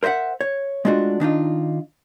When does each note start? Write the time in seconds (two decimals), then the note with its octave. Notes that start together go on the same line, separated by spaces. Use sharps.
0.03 A#4 C5 D#5 E5 F#5
0.41 C#5
0.85 G#3 A3 D4 F4 F#4
1.20 D#3 D4 D#4 F4